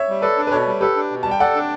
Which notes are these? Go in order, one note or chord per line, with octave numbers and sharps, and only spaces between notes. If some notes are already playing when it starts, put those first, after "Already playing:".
Already playing: C#5 E5
G3
A4 B4 D5
D4
B4
B2 A4 C#5
G3
G4 A4 B4
D4
B2
G3 A5
G5
A4 D5 F#5
D4